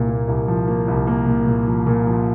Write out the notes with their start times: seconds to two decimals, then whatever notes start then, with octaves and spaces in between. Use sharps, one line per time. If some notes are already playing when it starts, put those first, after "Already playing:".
Already playing: C2 A#2
0.08 A#3
0.28 C2
0.48 F3
0.68 A#3
0.88 C2
1.07 A#3
1.27 A#2
1.47 A#2
1.67 F3
1.86 A#2
2.07 F3